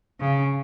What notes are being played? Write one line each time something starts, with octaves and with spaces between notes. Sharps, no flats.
C#3